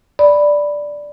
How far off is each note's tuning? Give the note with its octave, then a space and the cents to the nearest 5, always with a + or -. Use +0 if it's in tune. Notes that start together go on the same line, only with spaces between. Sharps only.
D5 +0 B5 +0